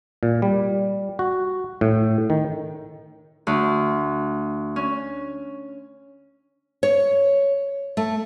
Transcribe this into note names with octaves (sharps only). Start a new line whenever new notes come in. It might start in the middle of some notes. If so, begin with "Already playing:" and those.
A#2
G3
F#4
A2
D#3
D2
C#4
C#5
A3